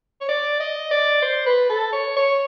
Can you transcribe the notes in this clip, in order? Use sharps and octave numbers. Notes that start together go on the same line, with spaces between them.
C#5
D5
D#5
D5
C5
B4
A4
C#5
C#5